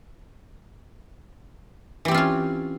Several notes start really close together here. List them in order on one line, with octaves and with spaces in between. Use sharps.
E3 G4 C4 F4 C#4